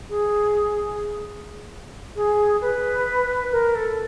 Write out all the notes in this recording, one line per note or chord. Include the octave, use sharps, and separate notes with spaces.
G#4
G#4
B4
A#4
A4